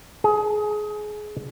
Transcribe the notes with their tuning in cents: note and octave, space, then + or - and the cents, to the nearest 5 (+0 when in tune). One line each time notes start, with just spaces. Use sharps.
G#4 +20